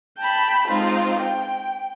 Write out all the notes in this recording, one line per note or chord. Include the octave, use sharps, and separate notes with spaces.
G5 A5 B5
G#3 C4 D#4 F4
G5